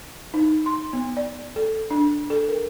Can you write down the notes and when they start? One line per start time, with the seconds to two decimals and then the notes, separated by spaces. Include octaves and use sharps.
0.34 D#4
0.66 C6
0.93 B3
1.17 D5
1.56 A4
1.91 D4
2.30 A4
2.49 A#4